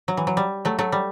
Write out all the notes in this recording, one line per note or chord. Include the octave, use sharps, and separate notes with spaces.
F#3
E3
F#3
G3
F#3 A3
F#3 A3
G3